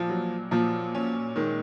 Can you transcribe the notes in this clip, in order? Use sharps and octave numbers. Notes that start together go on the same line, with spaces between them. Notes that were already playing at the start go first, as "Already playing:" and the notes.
Already playing: A#2 F3
F#3
A#2 F3
C#4
D#3 G#3